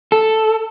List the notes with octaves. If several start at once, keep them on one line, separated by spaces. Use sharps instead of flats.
A4